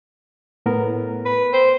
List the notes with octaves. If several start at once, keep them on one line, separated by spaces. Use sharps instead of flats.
A2 B3 A#4
B4
C5